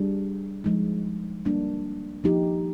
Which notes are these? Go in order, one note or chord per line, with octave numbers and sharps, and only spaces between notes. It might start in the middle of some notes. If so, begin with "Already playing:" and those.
Already playing: G3 D4 G#4
F3 G#3 D#4
G3 A#3 D4
F3 A#3 D#4 G4